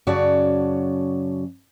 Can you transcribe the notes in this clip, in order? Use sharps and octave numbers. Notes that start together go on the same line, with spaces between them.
F#2 C#3 F#4 C#5 D5 A5